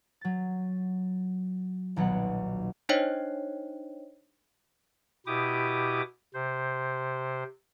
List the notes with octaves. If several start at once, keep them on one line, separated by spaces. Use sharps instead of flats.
F#3 A6
D#1 B1 F#3 B3 F#5
D4 D#4 C5 C#5 D#5 G5
B2 E4 G4 D6 D#6
C3 C5